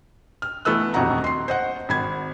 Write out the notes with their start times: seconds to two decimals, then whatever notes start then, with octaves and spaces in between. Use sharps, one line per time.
0.42 F6
0.65 E3 A3 B3 E6 F#6
0.94 D#1 F2 D#4 F#4 F#5 A#5
1.24 C6 C7
1.48 C5 D#5 F#5
1.89 G#1 B5 G#6